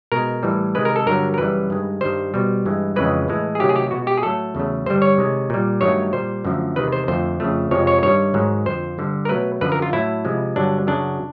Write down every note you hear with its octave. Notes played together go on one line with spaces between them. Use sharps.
B2 G#3 A#4
A2 E3 G3
C3 D#3 G#3 B4
A#4
A4
G2 D3 F#3 A#4
A#4
F#2 C#3 E3 G3 B4
G2 D#3 G#3
G2 D#3 G3 C5
B2 G3
G2 E3 G#3
F2 C#3 E3 G#3 B4
A2 E3 G#3
G#4
C3 D#3 F#3 A3 G4
G#4
G4
B2 G#3 F#4
G4
G#4
A2 F#3 A3 A4
E2 C#3 F#3 A3
G2 D3 G3 C5
C#5
C3 D#3 G#3
A#2 G3
G2 D#3 F#3 A3 C#5
A#2 G3 C5
F#2 D3 F3 A3
E2 C3 D#3 G#3 B4
C5
F2 D3 F3 A3 C5
F2 C#3 F3 A3
F2 C3 F3 G#3 C#5
C#5
G2 D#3 G3 C#5
G#2 D#3 F#3
F2 D3 F3 C5
G2 D3 G3
A#4
B2 F#3 A3 B4
F#2 D3 F3 B4
A#4
F4
A2 F#3 A3 E4
C3 F3 G#3
G2 D3 F#3 D4
F#2 C#3 F#3 D4